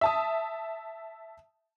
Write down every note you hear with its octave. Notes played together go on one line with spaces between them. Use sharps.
E5 A5 D#6